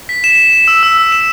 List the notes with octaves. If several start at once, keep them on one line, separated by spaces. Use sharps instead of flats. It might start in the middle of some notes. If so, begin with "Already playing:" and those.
B6
E7
E7
E7
E6
E6
E6
E7